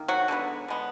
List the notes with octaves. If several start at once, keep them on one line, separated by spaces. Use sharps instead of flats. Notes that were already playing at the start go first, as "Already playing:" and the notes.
Already playing: D#3 A#3
F#3 F#4
D3 G#3 B3
D3 G#3 B3